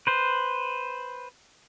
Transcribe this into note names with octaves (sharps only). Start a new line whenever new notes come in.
B4 C5